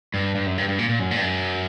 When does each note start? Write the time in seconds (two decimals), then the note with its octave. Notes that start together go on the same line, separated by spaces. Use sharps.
0.14 G2
0.35 G2
0.46 F#2
0.58 G2
0.68 G2
0.79 A#2
0.89 A#2
0.99 F#2
1.11 A#2
1.17 G2
1.21 F#2